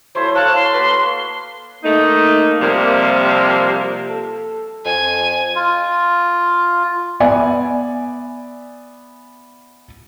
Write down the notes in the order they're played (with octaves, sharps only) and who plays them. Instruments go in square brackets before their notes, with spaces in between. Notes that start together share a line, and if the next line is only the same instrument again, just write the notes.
[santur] F#3 A3 E4 [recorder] C5
[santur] A4 C#5 F5 [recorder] A5 [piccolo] F#6
[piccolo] C6
[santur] A#3 F#4 [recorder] B4
[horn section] A3 A#3 D#4
C3 F3 G3 A#3
[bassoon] A4
[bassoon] F2 [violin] G#5
[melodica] F4
[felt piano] B3 D5 E5 G#5